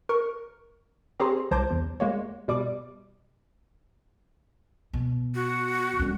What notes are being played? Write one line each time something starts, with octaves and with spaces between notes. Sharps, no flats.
A#4 C#6
C4 G4 G#4 C5 A#5 C6
C2 C5 A5 A#5 D6 G6
E2
G#3 A#3 C#5
B2 G3 D6
B2
F#4
G3 C#4